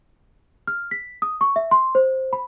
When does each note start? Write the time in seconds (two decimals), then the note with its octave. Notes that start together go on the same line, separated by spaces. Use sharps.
0.67 F6
0.91 B6
1.22 D#6
1.41 C#6
1.56 E5
1.71 C6
1.95 C5
2.33 B5